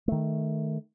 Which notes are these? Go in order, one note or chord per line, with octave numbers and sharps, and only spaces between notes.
D#3 A3